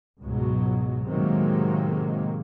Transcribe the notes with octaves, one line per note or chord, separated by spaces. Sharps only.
C#2 G#2 B2 F#3
A2 C3 D#3 F#3 G#3 A#3